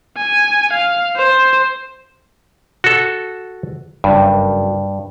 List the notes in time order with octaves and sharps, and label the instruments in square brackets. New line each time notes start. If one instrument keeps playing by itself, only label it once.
[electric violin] G#5
F5
C5
[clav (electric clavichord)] F#4 A4
[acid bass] F#1 [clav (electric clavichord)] G2